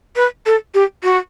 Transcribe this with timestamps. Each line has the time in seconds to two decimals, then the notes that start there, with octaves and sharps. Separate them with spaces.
0.16 B4
0.46 A4
0.75 G4
1.03 F#4